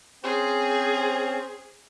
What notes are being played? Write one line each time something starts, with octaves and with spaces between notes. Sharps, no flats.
C4 C#4 G#4 C5